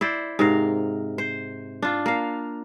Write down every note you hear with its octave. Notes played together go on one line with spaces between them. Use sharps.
E4 C5 D5
G#2 C3 A#4 F5
C5
D4 F4
A#3 F5